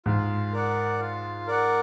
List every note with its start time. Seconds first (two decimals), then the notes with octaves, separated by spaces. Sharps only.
0.06 G#2 F4
0.53 A#4 D5 F#5
1.00 F4
1.47 A#4 D5 F#5